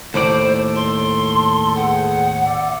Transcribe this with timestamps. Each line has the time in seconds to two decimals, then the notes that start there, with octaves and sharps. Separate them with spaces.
0.14 D#2 A2 A4 C5 D5
0.76 C6
1.76 B3 G#4 F#5 G5
2.45 D5 E5